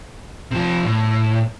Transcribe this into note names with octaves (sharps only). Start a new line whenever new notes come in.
C3 F3
A2